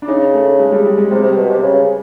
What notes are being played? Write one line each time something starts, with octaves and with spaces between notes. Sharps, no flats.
D4
C#3 D#4
A3
G#3
G3
G#3
G#3
C3 G3
C3
B2
C3
C#3